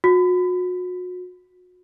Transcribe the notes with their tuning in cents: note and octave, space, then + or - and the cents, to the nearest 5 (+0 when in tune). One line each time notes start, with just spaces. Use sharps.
F#4 -35